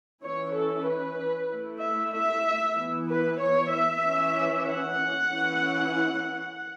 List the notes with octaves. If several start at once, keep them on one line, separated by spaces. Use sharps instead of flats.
E3 C#4 E4 C#5
A4
B4
E4
A3
E5
E5
E3 B3 E4
B4
C#5
E5
E3 C#4 E4
F#5
E3 C#4 E4